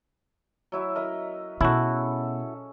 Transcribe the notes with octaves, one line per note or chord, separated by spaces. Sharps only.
F#3 E4 E5
A#4 D#5 E5
B2 C#4 E4 F#4 G#4 A4